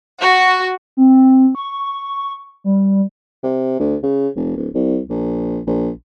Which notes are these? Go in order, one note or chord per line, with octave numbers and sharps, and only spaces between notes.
F#4
C4
C#6
G3
C3
D2
C#3
F1
D1
C2
A#1
A#1